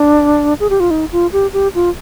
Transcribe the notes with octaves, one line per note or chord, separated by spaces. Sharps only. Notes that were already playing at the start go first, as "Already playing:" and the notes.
Already playing: D4
G#4
G4
F4
D#4
F4
G4
G4
F4